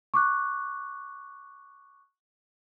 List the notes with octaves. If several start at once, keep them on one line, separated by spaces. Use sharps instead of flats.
C#6 D6 F#6